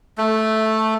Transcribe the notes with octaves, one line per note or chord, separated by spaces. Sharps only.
A3